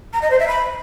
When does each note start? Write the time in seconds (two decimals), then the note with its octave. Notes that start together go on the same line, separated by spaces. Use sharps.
0.13 A#5
0.22 D#5
0.31 C5
0.39 E5
0.48 B5